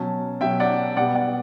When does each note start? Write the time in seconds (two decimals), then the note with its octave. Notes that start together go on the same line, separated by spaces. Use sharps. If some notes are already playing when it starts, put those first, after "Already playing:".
Already playing: B2 F#3 C#4 A5
0.41 B2 F#3 C#4 E5 G5
0.60 D5 F#5
0.97 B2 G3 B3 D5 F#5
1.15 D5 F#5